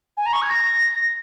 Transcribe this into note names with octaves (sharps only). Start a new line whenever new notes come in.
G#5
A#5
C#6
G#6
A#6